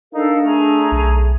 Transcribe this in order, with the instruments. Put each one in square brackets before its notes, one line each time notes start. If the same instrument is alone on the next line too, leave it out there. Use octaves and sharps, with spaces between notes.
[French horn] D4 [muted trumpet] D#4 [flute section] A4 A#4 F5
[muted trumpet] A3 [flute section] G#4 A#5
[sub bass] B1